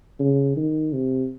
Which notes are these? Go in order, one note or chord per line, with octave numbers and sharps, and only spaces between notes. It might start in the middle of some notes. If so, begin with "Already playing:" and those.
C#3
D#3
C3